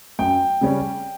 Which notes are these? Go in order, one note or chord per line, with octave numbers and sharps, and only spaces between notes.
F#2 G5
C#3 G3 C#4